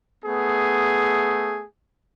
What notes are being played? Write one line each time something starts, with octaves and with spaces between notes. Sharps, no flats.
A3 B3 G#4